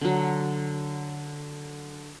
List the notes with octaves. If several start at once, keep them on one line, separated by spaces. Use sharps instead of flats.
D3 F#3